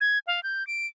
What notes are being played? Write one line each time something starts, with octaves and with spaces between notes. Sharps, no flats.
G#6
F5
G6
D7